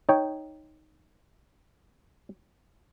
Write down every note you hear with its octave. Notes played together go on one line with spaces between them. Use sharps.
D#4 C#5 G5